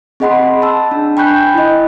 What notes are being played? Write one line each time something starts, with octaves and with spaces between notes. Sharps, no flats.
C4 G#4 D#5 F#5 B5 C6
A5 E6
D4
G5 G#5 B5 C#6 F#6 G6
E4 D#5